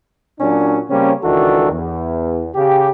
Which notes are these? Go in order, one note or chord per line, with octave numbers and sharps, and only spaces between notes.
A#2 F#3 C#4 D4
C#3 G3 A#3 C4 C#4
C#2 D#3 E3 D4 F#4 A4
E2
C#3 G4